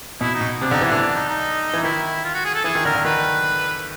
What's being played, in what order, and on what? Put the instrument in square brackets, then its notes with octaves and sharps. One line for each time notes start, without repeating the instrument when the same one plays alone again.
[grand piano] B2 [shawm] E4
[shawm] D#4
[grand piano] B2
[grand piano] C3 [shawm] D4
[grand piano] D3 [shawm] D#4
[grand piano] E3
[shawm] D4
[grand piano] D3
[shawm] D4
D#4
D#4
[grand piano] E3
[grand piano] D#3 [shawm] E4
[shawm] F4
F#4
G#4
A4
[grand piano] E3 [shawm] G#4
[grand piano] D#3
[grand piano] D3 [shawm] A#4
[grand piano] D3
[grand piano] D#3 [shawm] B4